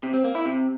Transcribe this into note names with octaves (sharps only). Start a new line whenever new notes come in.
C3
C4
A#3
E4
C3